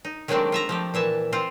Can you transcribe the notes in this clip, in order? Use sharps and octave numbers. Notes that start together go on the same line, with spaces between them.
D#4
D#3 F#3 G#3 A3 C4 D4
F4 E5 A#5
F3 A3 G4
A#2 E3 E5 A5
C4 F4 C5